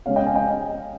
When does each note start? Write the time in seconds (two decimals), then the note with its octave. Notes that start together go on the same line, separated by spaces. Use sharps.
0.06 C#3 G#3 C#4 C#5 F5
0.16 D#5 G5
0.26 F5 G#5
0.36 D#5 G5